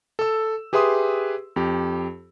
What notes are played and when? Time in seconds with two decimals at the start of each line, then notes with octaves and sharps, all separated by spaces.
0.19 A4 E6
0.73 G4 G#4 B4 E5 C6 D#6
1.56 F2 G4